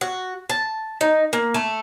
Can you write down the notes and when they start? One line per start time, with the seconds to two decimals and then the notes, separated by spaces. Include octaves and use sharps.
0.01 F#4
0.50 A5
1.01 D#4
1.33 A#3
1.54 A3